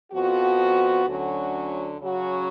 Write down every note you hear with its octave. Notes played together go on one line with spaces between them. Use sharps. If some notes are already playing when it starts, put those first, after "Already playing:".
F2 F3 B3 F#4
D2 D3 F#3 C#4 F#4
C#3 F#3 C#4 F#4